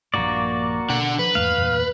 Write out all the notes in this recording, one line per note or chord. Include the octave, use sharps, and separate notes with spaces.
A#1 G2 A#3 F#4 D5
B2 D3 F#5
F3 B4
E2 G#2 A3 F5
E2 G2 A#2